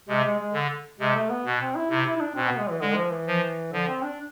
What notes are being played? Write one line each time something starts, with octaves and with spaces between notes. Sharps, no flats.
C3 G#3
G#3
G#3
D3
C3 G#3
A3
B3
B2
C4
E4
C3 E4
E4
E4
D4
B2 C4
B3
G#3
E3
D3 G#3
F3
E3
F3
D3 F3
C4
D4